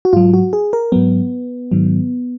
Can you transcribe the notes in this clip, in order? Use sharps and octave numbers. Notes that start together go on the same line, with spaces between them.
F#4
G#2 F#3 F4
F#4
G#4
A#4
G#2 F#3 B3
G#2 D#3 F#3